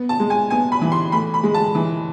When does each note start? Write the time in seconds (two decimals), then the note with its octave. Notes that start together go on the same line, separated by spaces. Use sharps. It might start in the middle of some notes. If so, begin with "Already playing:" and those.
Already playing: B3
0.09 A5
0.20 G#3
0.30 G#5
0.50 B3 G#5
0.72 B5
0.81 E3
0.92 C6
1.12 A2 B5
1.34 B5
1.43 G#3
1.54 A5
1.75 E3